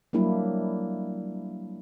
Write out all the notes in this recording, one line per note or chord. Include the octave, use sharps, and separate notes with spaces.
F#3 G3 A#3 D4 E4